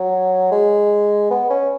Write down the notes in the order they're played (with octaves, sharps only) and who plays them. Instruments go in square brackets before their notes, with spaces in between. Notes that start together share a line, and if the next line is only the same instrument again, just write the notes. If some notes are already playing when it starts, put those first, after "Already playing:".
Already playing: [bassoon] F#3
G#3
B3
C#4